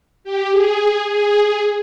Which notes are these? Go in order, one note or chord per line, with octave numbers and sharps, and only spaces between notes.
G4
G#4
G#4